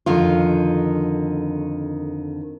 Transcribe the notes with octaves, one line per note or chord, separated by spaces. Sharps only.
F2 D3 D#3 F4